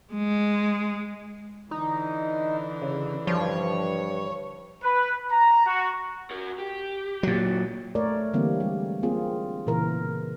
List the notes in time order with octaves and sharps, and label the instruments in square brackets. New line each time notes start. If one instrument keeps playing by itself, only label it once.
[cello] G#3
[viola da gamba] D3 E3 [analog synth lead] D#4
[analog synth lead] C#3
[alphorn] G2 [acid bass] F3 [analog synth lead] C#5
[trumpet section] B4
A#5
F#4
[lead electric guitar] F#4 A#4
G4
[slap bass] A#2 F#3
[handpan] A3 A#4 C#5 D5
D3 E3 G3 A#3 C4
G3 G#3
A#3 C4 F4 G#4
A#2 C#3 E3 A#4